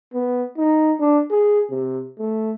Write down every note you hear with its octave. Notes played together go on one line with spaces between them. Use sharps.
B3
D#4
D4
G#4
C3
A3